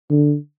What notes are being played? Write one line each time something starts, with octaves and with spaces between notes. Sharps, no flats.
D3